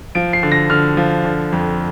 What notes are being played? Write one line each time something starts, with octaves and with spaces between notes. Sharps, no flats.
F3 D7
C7
D3
A#6
D3 F6
F3
D3
F2